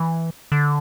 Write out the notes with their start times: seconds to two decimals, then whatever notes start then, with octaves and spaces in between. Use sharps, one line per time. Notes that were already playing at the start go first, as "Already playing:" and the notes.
Already playing: E3
0.52 D3